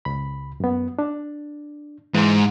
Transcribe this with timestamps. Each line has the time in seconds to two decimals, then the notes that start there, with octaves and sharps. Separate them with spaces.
0.05 C#2 B5
0.60 F#2 B3
0.99 D4
2.15 G#2 E3 G#3